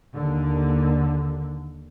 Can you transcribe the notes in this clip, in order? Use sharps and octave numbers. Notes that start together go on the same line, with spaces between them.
D#2 D3